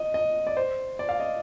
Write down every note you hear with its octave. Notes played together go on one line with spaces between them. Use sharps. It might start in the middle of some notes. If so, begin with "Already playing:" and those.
Already playing: D#5
D#5
D5
C5
D5
F5
D#5